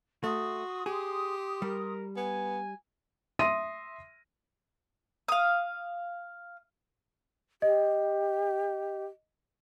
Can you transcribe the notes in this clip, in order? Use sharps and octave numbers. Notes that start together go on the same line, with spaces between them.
A3 F#4 C6 D#6
G4 G#4
G3 A#4
B3 G#5
E5 C6 D#6 A#6 D#7
F5 D#6
G4 D#5